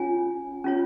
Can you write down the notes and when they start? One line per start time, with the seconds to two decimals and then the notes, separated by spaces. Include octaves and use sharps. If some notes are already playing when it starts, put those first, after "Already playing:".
Already playing: C#4 F4 C#5 G#5
0.64 C#4 F4 C#5